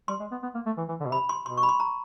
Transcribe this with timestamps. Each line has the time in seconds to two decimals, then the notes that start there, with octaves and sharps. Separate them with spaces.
0.08 G3 C6
0.20 G#3
0.31 B3
0.43 B3
0.55 A#3
0.66 A3
0.77 E3
0.89 E3
1.00 D3
1.06 B2
1.11 C3 B5
1.29 C6
1.46 B2 C6
1.57 C#6
1.63 B5
1.69 C6
1.80 A#5